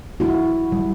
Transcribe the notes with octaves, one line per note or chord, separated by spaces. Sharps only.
E4 F#4
G3